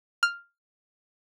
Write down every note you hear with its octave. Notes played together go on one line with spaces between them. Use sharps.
F6